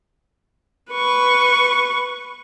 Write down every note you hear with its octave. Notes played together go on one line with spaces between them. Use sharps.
B4 C#6